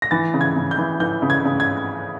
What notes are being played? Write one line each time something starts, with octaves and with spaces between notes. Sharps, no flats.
A#6
E3 A6
C#3
G#6
C#3
G6
E3
E3 G6
C#3
G#6
C#3
G#6